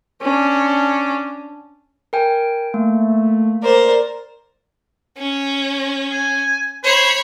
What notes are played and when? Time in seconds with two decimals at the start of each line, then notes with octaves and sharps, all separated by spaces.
0.22 C#4 D4
2.13 A#4 G5 G#5
2.74 A3 A#3
3.62 A#4 C5 D5
5.18 C#4
6.12 G#5
6.84 C5 C#5 B5